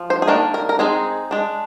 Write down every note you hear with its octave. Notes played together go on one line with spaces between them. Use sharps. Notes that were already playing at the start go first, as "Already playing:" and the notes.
Already playing: F3
C5
G#4
D#3 A#3 D4 A#4
A#4
A#4
G#3 C4 D#4 G#4
G#3 D4